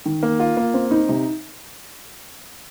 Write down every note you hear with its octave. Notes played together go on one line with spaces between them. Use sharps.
D#3
A#3
F4
A#3
C4
D#4
C3